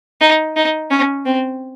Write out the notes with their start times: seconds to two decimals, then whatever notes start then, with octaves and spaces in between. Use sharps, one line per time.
0.21 D#4
0.56 D#4
0.91 C#4
1.26 C4